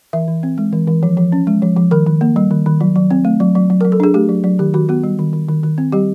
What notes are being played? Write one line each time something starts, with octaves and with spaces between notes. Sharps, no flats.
E3 E5
E3
C4
G#3
E3
E3
F3
F3
C#4
G#3
F3
F3
D#3 A#4
D#3
A#3
G3
D#3
D#3
F#3
F#3
C4
A3
F#3
F#3
F#3
F#3 A#4
A4
D4 G#4
A3 G4
F#3
F#3
D#3 G4
D#3 F#4
B3 F#4
G3
D#3
D#3
D#3
D#3
C4
G3 G4